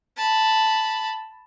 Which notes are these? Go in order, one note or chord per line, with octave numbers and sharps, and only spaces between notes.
A5 B5